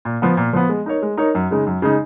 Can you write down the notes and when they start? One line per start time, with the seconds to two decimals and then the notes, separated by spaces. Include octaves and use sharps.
0.05 A#2
0.22 F3 B3
0.37 A#2
0.53 F3 B3
0.69 G#3
0.86 D#4 A#4 C#5
1.02 G#3
1.17 D#4 A#4 C#5
1.35 F#2
1.51 C#3 G#3 D#4
1.66 F#2
1.82 C#3 G#3 D#4